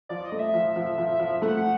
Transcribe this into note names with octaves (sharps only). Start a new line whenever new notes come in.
F3 D5
D#5
A3
E5
F3
F3
F3
F3
A3 F#5
F#5